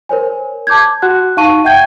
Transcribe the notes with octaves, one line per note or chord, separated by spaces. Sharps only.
A#4 C5 C#5 G#5
A5 D6 G6 G#6
F#4 F#5 F#6
D#4 F5 A5 C#6 D#7
E5 F#5 G5 G6 G#6